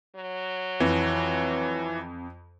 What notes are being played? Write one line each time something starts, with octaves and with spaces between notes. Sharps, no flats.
F#3
F2 E3